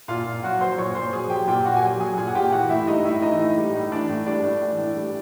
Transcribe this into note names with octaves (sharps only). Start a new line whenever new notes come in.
A#2 F4 F5
A#2
F#3 F#4 F#5
F#3 C5 C6
A#2 C#5 C#6
A#2 C5 C6
F#3 G#4 G#5
F#3 G4 G5
A#2 G4 G5
A#2 F#4 F#5
G#5
F#3 G4 G5
F#3 G#4 G#5
A#2 G#4 G#5
F#5
A#2 G4 G5
E3 F#4 F#5
A2 E4 E5
G3 D#4 D#5
A2 E4 E5
E3 D#4 D#5
A2
G3
A2
E3 D4 D5
A2
G3 D4 D5
A2
E3
A2
G3